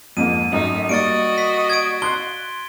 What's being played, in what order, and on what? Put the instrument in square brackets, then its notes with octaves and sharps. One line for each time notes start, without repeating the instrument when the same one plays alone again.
[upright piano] F2 G#2 A#3 [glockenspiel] D#7
[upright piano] G#1 F#2 [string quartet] A3 D#4
[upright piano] G3 A#3 [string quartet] F#4 D#5 [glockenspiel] A6 C#7 D7
[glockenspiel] B6
G#6 D7
[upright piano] C6 F#6 C7 [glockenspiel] G7